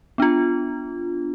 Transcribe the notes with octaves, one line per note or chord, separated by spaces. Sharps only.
B3 D4 F4